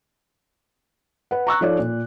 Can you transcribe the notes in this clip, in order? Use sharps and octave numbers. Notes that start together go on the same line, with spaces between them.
B4 F#5
A#5 C#6 E6 F#6
F3 D#4 A4 C#5 D5
A#2